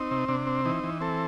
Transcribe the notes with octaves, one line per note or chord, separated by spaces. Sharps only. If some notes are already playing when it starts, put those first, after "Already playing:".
Already playing: C4 D#4
C3
C3 D4
C4
E3 D#4
E3
C4 A4